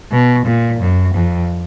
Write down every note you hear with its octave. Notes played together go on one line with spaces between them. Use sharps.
B2
A#2
F#2
F2